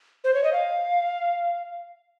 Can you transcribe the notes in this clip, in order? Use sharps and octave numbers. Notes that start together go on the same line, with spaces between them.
C5
C#5
D#5
F5